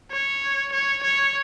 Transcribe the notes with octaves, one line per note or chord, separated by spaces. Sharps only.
C#5
C#5
C#5